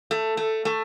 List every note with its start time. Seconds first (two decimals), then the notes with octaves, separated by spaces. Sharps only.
0.11 A3
0.37 A3
0.65 A3